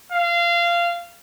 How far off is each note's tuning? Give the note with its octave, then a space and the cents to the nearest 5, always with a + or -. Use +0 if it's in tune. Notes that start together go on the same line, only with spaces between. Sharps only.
F5 -20